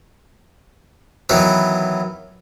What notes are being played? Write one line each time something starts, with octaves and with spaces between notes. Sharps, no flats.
D#3 E3 F#3 B3